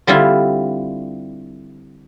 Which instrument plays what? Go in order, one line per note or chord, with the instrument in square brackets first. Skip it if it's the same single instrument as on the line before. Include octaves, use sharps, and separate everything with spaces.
[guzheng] D3 G3 C4 E4 F4